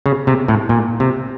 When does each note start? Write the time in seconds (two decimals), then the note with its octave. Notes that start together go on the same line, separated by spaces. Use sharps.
0.06 C#3
0.27 C3
0.48 A2
0.69 A#2
1.00 C3